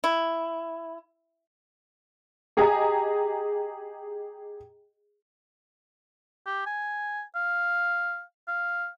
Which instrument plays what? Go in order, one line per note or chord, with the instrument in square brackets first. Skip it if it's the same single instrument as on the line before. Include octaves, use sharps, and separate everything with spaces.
[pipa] E4
[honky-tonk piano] G4 G#4 D#5 G#5 A#5 D#6
[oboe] G4
G#5
F5
F5